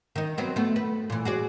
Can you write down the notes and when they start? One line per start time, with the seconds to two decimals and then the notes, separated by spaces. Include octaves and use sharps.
0.16 D#3 D#4
0.38 F#3 B3 C4
0.56 A3 B3
0.76 B4
1.10 A#2 E3
1.25 F#4 G#4 D5